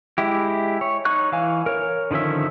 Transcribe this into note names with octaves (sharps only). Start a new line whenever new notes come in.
G#3 E4 G4
C#5
D#4 C#5 C#6 F#6
E3 F5 G#5
A#4 C#5
D3 D#3 F3 C#4 E5